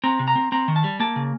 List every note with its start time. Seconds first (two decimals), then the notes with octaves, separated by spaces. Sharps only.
0.04 C4 A#5
0.19 C3
0.28 A#5
0.35 C4
0.52 C4 A#5
0.68 D#3
0.76 A5
0.84 G3
1.00 A#3 A5
1.16 C#3